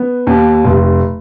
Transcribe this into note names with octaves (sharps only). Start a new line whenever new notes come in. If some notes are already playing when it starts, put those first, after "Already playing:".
Already playing: B3
D#2
F1